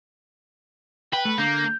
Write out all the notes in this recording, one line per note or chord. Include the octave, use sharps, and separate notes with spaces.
B4 G5
A3 A4
D3 A#3 G6